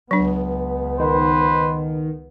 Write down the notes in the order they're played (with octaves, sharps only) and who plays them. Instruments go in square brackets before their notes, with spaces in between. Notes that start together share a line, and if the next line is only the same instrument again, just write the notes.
[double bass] C#2 B3 [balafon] F#3 D4
[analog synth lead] D#3 [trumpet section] B4 C5